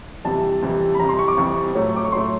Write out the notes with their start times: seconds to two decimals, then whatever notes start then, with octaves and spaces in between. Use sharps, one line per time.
0.24 F2 C3 E3 G3 A5
0.62 F2 C3 E3 G3
0.95 B5
1.00 F2 C3 E3 G3 A#5
1.09 C6
1.19 C#6
1.28 D6
1.37 F2 C3 E3 G3 C#6
1.75 A2 F#3 A3
1.96 D6
2.05 C#6
2.12 A2 F#3 A3 C6